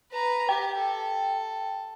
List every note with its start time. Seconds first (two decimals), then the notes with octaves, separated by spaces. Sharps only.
0.12 B4 A#5
0.49 G4 G5
0.79 A4